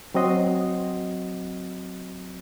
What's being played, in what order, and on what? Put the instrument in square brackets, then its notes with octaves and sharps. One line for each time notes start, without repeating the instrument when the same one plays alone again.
[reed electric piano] F#3 C4 F#4 D#5 C6